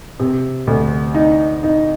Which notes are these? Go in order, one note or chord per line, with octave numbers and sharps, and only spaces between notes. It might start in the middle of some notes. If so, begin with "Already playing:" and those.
C3
D2
D#4
D#4